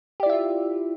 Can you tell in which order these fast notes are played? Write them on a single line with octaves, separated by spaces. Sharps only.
G4 D5 E4 E5 F4